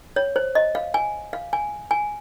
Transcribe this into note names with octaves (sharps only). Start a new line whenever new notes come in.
C#5
C5
D#5
F5
G#5
F5
G#5
G#5